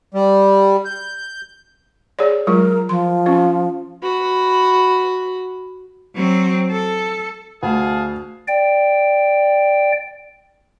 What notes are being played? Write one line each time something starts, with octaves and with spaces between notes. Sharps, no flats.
G3
G6
G#4 C#5 D5
F#3 G#3 F4 A#4
F3 C6
C4 C#4 F4
F#4 B5
F#3 C4
A4
D2 G#4 F5 A5
D5 G5